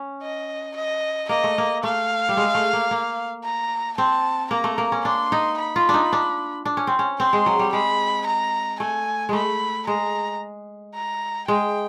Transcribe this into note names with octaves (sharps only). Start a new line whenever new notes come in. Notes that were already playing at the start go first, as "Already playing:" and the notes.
Already playing: C#4
D#5
D#5
A#3 D#5
A3
A#3
A3 F5
G3
G#3
A3
A#3
A#3
A#5
C4 A5
A#3 A#5
A3
A#3
C#4
D4 C6
D#4
B5
F4
D4 D#4
D4
D4
C#4
C4
C#4
C4 C6
G#3
F#3
G3
G#3 B5
A#5
A3 G#5
G#3 A3 B5
G#3 A#5
A#5
G#3 G5